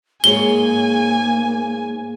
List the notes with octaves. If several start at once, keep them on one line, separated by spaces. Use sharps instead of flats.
G#2 A#3 G#4 C#5 G#5 G7